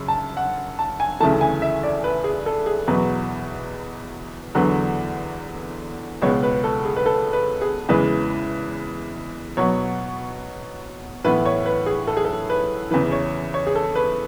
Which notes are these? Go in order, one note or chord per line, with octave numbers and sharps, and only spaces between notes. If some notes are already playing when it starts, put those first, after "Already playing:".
Already playing: F#2 C#3
A5
F#5
A5
G#5
D2 C#3 E3 A3 A5
G#5
E5
D5
B4
G#4
A4
G#4
E2 B2 F#3 B4
E2 D3 F#3 B3
C#2 B2 G#3 B3 C#5
B4
A4
G#4
B4
A4
B4
G#4
E2 C#3 E3 G#3 B4
B2 F#3 B3 C#5
A2 E3 B3 B4
C#5
B4
G#4
A4
G#4
A4
B4
E2 C#3 E3 B4
C#5
C#5
G#4
A4
B4